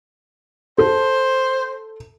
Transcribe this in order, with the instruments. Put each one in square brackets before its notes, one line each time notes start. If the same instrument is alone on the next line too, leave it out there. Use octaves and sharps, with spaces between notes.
[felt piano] A4 [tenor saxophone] C5